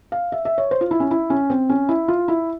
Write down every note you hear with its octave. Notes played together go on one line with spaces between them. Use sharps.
F5
E5
E5
C#5
C5
F4
E4
C#4
E4
C#4
C4
C#4
E4
F4
E4